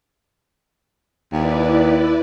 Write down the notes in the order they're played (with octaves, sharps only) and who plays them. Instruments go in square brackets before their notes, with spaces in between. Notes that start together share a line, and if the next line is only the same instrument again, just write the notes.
[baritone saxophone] D#2 [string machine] E4 B4 D5